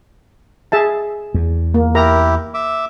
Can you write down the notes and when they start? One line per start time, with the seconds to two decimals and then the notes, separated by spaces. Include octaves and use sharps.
0.72 G#4 E5 A5
1.34 E2
1.74 A#3
1.95 E4 G4 A#4 A#5
2.54 E5 D6